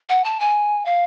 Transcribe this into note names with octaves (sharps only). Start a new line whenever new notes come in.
F#5
A5
G#5
F5